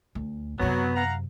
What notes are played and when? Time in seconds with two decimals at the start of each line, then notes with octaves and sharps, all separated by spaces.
0.15 D2
0.60 F#2 C3 F#3 B3
0.95 F5 F#5 A#5